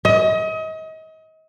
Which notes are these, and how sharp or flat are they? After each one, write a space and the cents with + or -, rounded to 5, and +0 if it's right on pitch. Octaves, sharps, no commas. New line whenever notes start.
D#5 +35